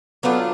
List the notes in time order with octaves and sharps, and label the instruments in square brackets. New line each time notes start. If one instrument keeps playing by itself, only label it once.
[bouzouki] F#3 A3 D4 F4 [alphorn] B3